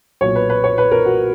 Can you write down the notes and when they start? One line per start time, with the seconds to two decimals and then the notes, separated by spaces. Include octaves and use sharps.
0.21 B1 A#2 C#5
0.36 B4
0.50 B4
0.64 C#5
0.78 B4
0.91 A#4
1.06 F#4